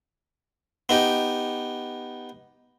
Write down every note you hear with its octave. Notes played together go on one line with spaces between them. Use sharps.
B3 D#4 G4